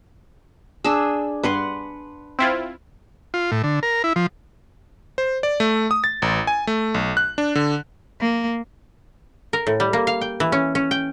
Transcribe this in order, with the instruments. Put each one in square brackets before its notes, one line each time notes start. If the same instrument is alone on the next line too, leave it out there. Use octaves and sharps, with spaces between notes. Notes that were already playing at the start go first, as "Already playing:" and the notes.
[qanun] D4 G#4 [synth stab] E6
[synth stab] G2 [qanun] B4 F#5 C6
[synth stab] C4 E4 F4
[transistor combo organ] F4
A2
D3
A#4
E4
F3
[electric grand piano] C5
D5
A3
D#6
A6
A1
G#5
A3
B1
F#6
D4
D3
[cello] A#3
[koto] A#4
A2
G3
A#3
F5
G5
E3
C#4
C#4
G5